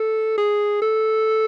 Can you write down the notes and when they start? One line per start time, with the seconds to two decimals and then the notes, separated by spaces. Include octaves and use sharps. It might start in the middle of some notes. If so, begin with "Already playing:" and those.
Already playing: A4
0.38 G#4
0.82 A4